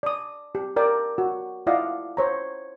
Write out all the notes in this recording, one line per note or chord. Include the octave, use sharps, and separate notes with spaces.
D5 D#6
G4
A#4 D5 G5
F#4
E4 F4 D5 D#5 F5 F#5
C5 C#5 A#5